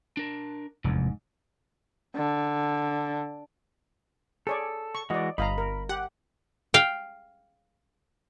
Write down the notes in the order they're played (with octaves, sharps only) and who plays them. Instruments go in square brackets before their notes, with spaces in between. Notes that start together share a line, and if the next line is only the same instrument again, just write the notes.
[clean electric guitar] D4 A#4 A5
[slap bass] F1 E2 [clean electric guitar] G#2
[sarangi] D3
[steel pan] G#4 C#5 D5 [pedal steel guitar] A4
[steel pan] C#6
[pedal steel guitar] E3 G#3 F#4 [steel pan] D5 D#5
[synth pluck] G1 [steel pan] D#5 F5 A#5 [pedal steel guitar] B5
[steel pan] A#4
[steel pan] G4 [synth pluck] F#5
[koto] F5 G5